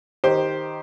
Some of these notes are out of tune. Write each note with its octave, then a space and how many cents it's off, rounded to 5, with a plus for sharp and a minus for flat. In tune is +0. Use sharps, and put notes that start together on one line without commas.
D#3 +0 G4 +0 C5 +0